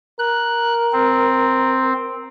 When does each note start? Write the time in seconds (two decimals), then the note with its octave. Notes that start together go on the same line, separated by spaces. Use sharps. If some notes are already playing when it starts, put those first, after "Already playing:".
0.19 A#4 F#6
0.93 C4